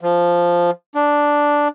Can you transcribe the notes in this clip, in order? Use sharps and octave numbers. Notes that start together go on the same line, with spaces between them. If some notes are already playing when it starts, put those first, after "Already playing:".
F3
D4